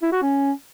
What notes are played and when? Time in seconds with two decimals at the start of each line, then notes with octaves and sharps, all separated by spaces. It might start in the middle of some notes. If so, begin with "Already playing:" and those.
0.02 E4
0.12 F#4
0.22 C#4